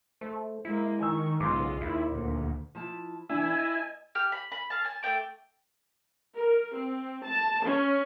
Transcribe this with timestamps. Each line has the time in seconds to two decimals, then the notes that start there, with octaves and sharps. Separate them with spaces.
0.21 A3 C5
0.65 G#3 A#3 E4
1.00 D#3 G#5 C#6 E6
1.40 B1 G#2 C#3 G#3 F4 C6 D6
1.81 D#2 D#3 E4
2.12 D2 A#2
2.75 F3 E4 A5
3.29 E3 D4 E4 G#5
3.49 D#5
4.15 G4 F6
4.32 B5
4.52 B5
4.70 F5 A5
4.84 G#5 A5
5.03 A3 C4 G5 D6
6.36 A#4
6.74 C4
7.23 A5
7.63 C#4